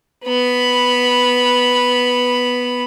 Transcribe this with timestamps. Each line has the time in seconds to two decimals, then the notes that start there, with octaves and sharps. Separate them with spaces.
0.25 B3 B5